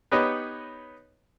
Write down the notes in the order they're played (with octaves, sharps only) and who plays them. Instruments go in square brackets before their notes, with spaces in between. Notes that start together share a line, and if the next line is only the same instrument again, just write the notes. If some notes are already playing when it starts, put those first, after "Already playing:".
[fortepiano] B3 D#4 G4 B4 C#5 D#5